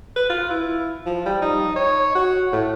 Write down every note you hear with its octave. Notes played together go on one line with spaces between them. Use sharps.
B4
F4
E4
F3
G3
D#4
C#5
F#4
A2